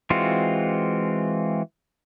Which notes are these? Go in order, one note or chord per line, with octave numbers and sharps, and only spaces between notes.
E3 G#3 C4 F4 F#4